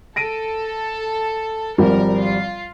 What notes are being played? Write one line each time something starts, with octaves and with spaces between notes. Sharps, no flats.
A4 A#6 D7 D#7
G#1 F3 G3 A#4
F4